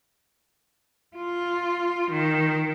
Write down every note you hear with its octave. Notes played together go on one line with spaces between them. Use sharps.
F4
D#3